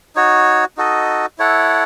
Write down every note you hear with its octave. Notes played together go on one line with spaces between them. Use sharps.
D#4 F#4 C#5
D#4 F#4 A4 D#5
E4 A4 C#5 F#5